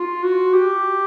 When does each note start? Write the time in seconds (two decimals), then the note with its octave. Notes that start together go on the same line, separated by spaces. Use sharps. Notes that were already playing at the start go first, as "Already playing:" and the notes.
Already playing: F4
0.23 F#4
0.54 G4